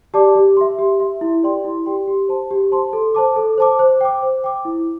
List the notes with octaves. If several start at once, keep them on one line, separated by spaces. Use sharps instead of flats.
G4 D5 A5 D6
G4
E5 C6
G4
E5 C6
E4
G4 D5 G5 C6
E4
G4 D5 G5 C6
G4
C5 A5 C6
G4
C5 A5 C6
A4
C5 A5 D6
A4
C5 A5 D6
C5
G5 D6
C5
G5 D6
E4